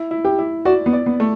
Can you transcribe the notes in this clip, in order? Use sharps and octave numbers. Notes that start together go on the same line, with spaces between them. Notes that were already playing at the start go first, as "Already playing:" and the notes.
Already playing: E4
E4
G4
E4
F#4 D5
B3
D5
B3
A3